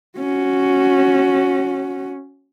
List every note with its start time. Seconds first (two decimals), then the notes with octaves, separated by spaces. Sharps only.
0.18 C#4 F#4